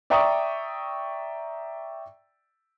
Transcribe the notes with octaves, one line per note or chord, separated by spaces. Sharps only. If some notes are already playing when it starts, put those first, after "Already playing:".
D5 E5 G5 A#5 C#6 D#6